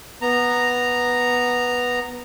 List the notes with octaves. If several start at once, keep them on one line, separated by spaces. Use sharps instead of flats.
B3 A#5